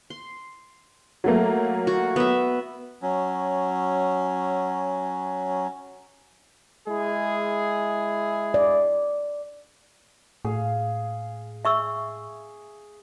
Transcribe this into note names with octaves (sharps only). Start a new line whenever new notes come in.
C6
F#3 A3 A#3
F#4
B3 E5
F#3 C#4
G#3 E4 G#4
D5
A2 G#4 F5
G#4 E5 C#6 E6